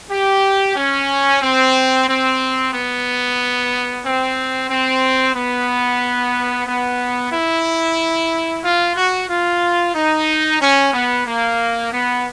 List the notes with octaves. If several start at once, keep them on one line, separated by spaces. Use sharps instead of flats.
G4
C#4
C4
C4
B3
C4
C4
B3
B3
E4
F4
F#4
F4
D#4
C#4
B3
A#3
B3